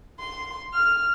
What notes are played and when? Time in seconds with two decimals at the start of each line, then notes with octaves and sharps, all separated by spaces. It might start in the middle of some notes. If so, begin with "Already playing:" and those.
0.19 C6
0.73 F6